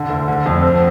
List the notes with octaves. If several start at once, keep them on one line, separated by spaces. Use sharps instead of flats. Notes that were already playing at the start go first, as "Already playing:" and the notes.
Already playing: D3
D2
D3
F2
C4